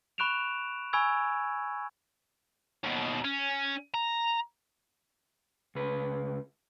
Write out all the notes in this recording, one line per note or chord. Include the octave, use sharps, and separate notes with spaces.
B5 C#6 F#6 D7 E7 F7
G#5 B5 C#6 E6 G#6
D#2 B2
C#4
A#5
C#2 B4